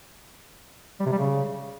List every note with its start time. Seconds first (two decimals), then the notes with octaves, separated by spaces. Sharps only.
1.00 G3
1.06 C3
1.12 G3
1.18 C#3